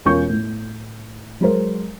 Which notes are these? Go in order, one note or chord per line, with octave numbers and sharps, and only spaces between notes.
E1 C#4 F4 A#4 C#6 G6
A2
F#3 G#3 A#4 C5